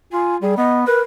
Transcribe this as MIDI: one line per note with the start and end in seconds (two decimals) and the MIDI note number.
0.13 0.36 65
0.13 0.36 80
0.42 0.55 55
0.42 0.55 68
0.57 0.83 59
0.57 0.77 75
0.87 1.01 70
0.87 1.01 71